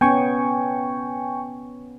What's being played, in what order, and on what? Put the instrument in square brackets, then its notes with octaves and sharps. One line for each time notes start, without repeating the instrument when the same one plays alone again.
[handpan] B3 C#4 [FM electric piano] G5 G#5 C#6